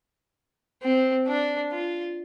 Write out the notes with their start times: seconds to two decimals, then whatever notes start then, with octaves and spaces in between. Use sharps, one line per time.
0.83 C4
1.27 D4
1.72 F4